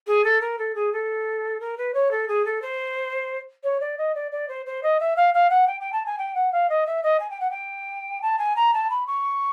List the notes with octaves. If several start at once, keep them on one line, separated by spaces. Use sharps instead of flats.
G#4
A4
A#4
A4
G#4
A4
A#4
B4
C#5
A4
G#4
A4
C5
C#5
D5
D#5
D5
D5
C5
C5
D#5
E5
F5
F5
F#5
G5
G5
A5
G#5
G5
F#5
F5
D#5
E5
D#5
G#5
G5
F#5
G5
A5
G#5
A#5
A5
B5
C#6